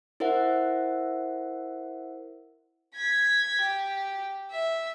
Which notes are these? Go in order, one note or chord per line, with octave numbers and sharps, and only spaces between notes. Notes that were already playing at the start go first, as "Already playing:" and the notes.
E4 A#4 C5 E5 F#5
G#6 B6
G4
E5